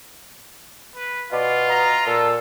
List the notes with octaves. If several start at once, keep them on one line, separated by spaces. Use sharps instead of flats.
B4
B2 F4 D5
D#5 A#5
A#2 A4